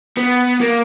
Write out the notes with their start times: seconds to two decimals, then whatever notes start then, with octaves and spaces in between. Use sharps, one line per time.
0.18 B3
0.61 A#3